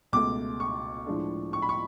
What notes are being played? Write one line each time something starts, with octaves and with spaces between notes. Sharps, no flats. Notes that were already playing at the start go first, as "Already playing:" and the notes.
C#2 B2 A3 D6
C#6
A2 F3 G#3 D4
C#6
B5
C#6